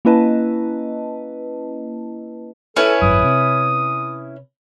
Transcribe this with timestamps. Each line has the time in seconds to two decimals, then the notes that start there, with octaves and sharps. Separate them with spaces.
0.05 A#3 C#4 E4 B4 D#5 A5
2.76 C#4 E4 A4 B4
3.02 G#1 F#2 D#6
3.24 C3